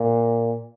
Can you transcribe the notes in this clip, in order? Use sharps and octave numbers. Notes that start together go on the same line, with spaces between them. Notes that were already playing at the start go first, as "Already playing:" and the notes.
Already playing: A#2